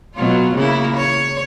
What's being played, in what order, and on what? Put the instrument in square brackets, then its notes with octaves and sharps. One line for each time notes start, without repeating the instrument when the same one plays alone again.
[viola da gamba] B2 F#3 F4
C#3 A#3 E4
C#5